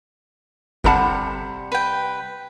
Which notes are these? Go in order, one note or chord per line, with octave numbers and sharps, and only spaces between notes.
G1 C3 G3 A4 F#5 A5
B4 G5